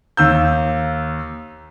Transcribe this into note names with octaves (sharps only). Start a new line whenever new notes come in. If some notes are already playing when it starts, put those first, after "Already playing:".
D#2 E6 G6